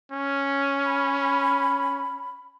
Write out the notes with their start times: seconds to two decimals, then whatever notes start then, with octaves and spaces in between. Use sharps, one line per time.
0.11 C#4
0.86 B5